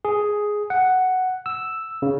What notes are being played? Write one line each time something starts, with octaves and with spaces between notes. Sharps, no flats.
G#4
F#5
E6
C#3